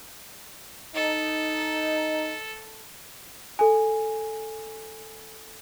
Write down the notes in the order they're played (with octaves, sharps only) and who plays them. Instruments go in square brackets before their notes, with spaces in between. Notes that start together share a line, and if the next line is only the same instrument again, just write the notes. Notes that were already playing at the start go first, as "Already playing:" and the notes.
[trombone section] D#4 [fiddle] A4
[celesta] A4 G#5